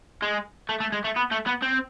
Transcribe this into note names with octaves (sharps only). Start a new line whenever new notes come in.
G#3
A3
A3
G#3
A3
B3
A3
B3
C4